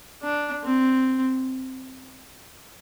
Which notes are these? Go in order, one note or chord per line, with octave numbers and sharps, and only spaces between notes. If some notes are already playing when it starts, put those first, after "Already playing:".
D4
C4